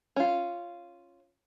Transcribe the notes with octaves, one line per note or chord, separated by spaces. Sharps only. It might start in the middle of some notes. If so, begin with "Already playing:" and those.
C#4 F4